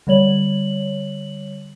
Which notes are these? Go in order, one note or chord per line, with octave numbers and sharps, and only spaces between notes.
D3 G3 C#5 F#7